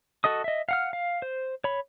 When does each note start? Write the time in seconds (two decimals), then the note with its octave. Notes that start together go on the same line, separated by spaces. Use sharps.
0.24 F#4 A4 D#5 D#6
0.44 D#5 E5
0.69 F5 F#5 F6
0.93 F5
1.22 C5
1.64 C#5 B5